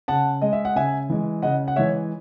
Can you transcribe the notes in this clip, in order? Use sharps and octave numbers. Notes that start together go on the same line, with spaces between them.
C#3 F#5 A5
G#3 D#5
E5
F#5
C#3 E5 G#5
E3 G#3
C#3 D#5 F#5
F#5
E3 G#3 C#5 E5